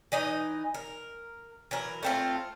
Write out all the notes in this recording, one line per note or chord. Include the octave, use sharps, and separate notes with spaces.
E3 D#4 D#5
A#4
E3 F#3 A#4
A3 C4 F4